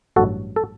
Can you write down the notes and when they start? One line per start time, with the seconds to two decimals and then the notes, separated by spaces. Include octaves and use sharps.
0.16 A1 G2 F#3 F#4 A4
0.56 A4